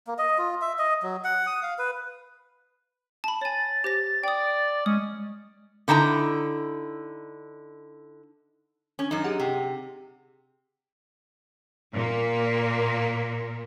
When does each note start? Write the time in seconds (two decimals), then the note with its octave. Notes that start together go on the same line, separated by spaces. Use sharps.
0.07 A#3
0.18 D#5
0.38 F4
0.61 E5
0.79 D#5
1.02 F#3
1.24 F#5
1.47 D#6
1.63 F5
1.78 B4
3.24 A5 B5
3.41 C#5 G#5 A6
3.84 G4 C5 A#6
4.24 D5 G5 D#6
4.86 G#3 C#4 D#6
5.88 D3 D#4 E4 A5 A#5
8.99 C#4
9.11 F#2 D#4
9.24 G4 G#4 F#5
9.40 C3
11.93 A#2 A#3